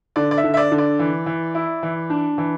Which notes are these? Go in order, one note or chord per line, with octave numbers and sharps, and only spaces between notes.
D3 D5
D5
E5
D3
E5
D5
D3
D5
E3
E3
E4
E3
D4
E3